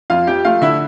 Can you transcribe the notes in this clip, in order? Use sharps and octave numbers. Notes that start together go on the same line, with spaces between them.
F2 F4 F5
F3 G4 G5
A3 F4 F5
D3 E4 E5